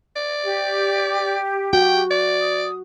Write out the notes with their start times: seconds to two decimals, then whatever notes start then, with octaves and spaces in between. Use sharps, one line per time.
0.16 D5
0.45 G4
1.73 F#4 G5
2.11 D5
2.41 D#6